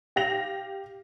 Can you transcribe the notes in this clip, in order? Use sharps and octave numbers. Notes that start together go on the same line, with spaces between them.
G4 F5 A#6 F7